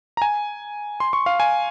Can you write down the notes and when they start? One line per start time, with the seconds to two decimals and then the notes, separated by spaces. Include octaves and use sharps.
0.17 A#5
0.22 G#5
1.00 C6
1.13 C#6
1.26 F5
1.40 G#5